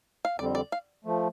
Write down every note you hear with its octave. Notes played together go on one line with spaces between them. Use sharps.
F5
F2 D3 G3 C4 D5
D5
F5
F3 A3